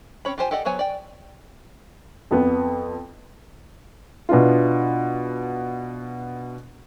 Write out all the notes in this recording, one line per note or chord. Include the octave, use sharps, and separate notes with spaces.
C4 C#4 C#5 B5
F4 G4 C5 G#5
G4 A4 D5 D#5 F#5
F#3 B3 C5 C#5 G#5
D5 G5
F2 B3
B2 B3 D4 E4 F4